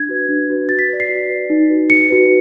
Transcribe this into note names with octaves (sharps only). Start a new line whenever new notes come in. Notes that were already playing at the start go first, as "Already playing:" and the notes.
Already playing: D4 G#6
F#4 B4
D4
F#4 B4
F#4 A6
B6
B4 D5
C7
F#4
B4 D5
D#4
F#4 B4
D#4 C#7
F#4 B4